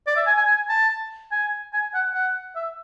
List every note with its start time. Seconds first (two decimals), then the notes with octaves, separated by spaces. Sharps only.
0.07 D5
0.16 E5
0.26 G#5
0.37 G#5
0.47 G#5
0.69 A5
1.32 G#5
1.73 G#5
1.94 F#5
2.14 F#5
2.55 E5